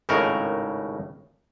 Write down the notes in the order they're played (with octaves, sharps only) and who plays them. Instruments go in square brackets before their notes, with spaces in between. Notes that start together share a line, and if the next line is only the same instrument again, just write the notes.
[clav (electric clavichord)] G#1 A2 C#3 D#4 A#4